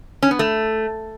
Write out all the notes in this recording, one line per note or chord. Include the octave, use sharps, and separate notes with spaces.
C#4
B3
A3